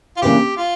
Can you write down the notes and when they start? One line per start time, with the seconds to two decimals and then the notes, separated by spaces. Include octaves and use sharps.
0.17 F4
0.22 C#3 E3 A#3 D4 G4
0.57 F4